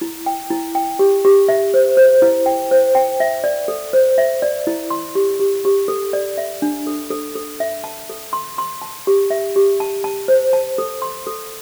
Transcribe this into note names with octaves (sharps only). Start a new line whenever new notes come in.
E4
G5
E4
G5
G4
G4
E5
C5
C5
E4
G5
C5
G5
E5
D5
A4
C5
E5
D5
E4
C6
G4
G4
G4
A4
D5
E5
D4
A4
A4
A4
E5
A5
A4
C6
C6
A5
G4
E5
G4
A5
A5
C5
A5
A4
C6
A4